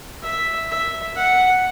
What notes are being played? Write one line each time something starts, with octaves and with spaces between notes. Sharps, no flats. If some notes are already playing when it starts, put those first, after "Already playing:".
E5
E5
F#5